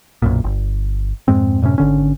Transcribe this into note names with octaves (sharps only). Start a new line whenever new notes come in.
B1 F#2 A#2
G1
F2 G#2 G#3 C4
F#2 A2 C3 C#4
G#1 D3 C#4